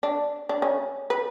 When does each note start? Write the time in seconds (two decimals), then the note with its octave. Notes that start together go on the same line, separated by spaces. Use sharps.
0.03 D4
0.49 D4
0.62 C#4
1.10 B4